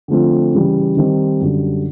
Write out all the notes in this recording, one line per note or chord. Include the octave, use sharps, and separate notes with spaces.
D3 F3 A3 C4 F4
C#3 E3 G3
D#3 G3 C4 D#4
F#2 D3 G3